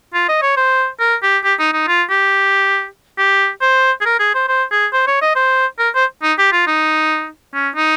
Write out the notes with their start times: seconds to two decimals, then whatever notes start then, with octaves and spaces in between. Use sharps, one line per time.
0.14 F4
0.29 D#5
0.42 C#5
0.57 C5
1.00 A#4
1.23 G4
1.44 G4
1.59 D#4
1.73 D#4
1.87 F4
2.10 G4
3.18 G4
3.61 C5
4.01 G#4
4.06 A#4
4.20 G#4
4.35 C5
4.49 C5
4.71 G#4
4.93 C5
5.07 C#5
5.22 D#5
5.36 C5
5.79 A#4
5.95 C5
6.23 D#4
6.38 G4
6.52 F4
6.67 D#4
7.54 C#4
7.76 D#4